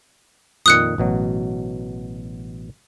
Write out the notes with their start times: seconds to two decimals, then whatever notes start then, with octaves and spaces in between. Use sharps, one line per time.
0.66 F2 A#2 D#3 D#6 F#6 C#7
0.98 A1 B2 F#3